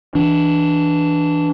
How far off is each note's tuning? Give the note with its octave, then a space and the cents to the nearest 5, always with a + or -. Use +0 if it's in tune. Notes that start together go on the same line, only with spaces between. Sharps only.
E3 +0 D4 +0